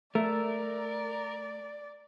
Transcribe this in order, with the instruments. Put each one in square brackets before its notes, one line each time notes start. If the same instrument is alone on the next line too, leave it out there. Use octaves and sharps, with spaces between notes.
[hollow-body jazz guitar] A3 [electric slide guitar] A#4 [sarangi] D5